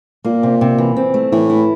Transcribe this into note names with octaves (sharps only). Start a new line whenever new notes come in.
A#2 A#3
C3
C3
E3
C4
A3
A2 E3
E4